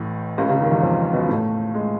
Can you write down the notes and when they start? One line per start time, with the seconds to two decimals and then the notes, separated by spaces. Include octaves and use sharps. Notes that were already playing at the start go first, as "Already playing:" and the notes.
Already playing: A1 A2
0.38 C#2 C#3
0.48 C#2 C#3
0.60 D#2 D#3
0.71 E2 E3
0.83 F2 F3
1.13 B2 B3
1.28 A2 A3
1.74 G#3